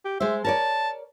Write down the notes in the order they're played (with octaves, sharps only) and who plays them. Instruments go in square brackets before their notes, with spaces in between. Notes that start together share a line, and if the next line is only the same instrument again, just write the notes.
[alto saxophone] G4
[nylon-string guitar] G#3 C5 [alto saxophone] E5
[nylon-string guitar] A#4 C#5 D5 [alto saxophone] A5